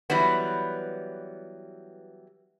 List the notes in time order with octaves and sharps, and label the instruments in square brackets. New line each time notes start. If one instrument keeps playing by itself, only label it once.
[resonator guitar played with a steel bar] E3 F#3 G3 B3